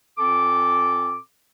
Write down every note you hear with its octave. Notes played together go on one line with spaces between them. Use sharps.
A#2 C4 A4 D6